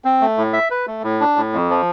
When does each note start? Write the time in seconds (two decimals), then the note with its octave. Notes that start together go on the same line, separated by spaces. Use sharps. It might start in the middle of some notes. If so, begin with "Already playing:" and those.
0.05 C4
0.21 A3
0.37 A2
0.53 E5
0.71 B4
0.87 A3
1.04 A2
1.21 D4
1.36 A2
1.53 F2
1.70 F3